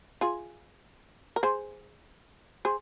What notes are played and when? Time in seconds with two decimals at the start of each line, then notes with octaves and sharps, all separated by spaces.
0.21 F4 G#4
1.36 A#4
1.43 G#4 C5
2.65 G#4 C5